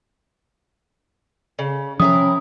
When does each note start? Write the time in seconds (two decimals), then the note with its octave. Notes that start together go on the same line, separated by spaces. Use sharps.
1.59 C#3
2.00 C3 F3 C#4 E4 A#4 D#6